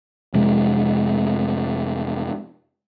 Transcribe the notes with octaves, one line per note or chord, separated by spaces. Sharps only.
F2 C3 G#3